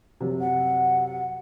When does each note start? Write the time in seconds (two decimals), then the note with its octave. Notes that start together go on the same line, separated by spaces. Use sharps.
0.20 F#2 C3
0.41 F#5